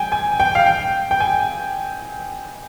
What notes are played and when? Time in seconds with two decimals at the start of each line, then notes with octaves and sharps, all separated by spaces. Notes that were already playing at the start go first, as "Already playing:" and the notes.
Already playing: G5 G#5
0.12 G#5
0.40 G5
0.55 F5
0.66 G5
1.11 G5
1.20 G#5